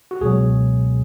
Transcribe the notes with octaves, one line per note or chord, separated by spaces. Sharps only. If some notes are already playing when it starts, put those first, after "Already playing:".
F#4
C#2 B2 F#3 G#4